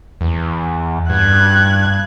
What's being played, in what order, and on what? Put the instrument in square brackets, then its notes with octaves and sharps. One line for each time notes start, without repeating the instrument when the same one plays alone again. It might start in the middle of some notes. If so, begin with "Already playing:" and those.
[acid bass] E2
[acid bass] G2 [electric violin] F#6 G#6